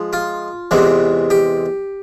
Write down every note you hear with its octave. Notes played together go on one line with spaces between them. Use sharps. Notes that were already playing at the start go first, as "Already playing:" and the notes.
Already playing: F3 G#3
F4
E2 C3 E3 G#3
G4